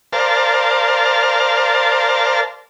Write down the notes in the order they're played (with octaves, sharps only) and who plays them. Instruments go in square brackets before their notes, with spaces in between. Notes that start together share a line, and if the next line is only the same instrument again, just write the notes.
[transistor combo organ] A#4 C5 D5 F5 A5